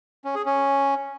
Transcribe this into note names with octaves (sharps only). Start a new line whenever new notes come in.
C#4
G#4
C#4